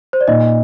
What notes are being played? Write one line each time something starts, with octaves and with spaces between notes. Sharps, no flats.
C5
D5
A#2 D#4 D#5